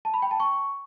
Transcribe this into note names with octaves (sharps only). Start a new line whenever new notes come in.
A5
B5
G5
A5
C#6